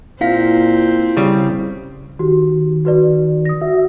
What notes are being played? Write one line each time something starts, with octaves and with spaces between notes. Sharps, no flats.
A#2 C4 E4 F5 B6
C#3 G3
D#3 F#4 G4
F#4 B4 D5
D#6 A#6
F#4 E5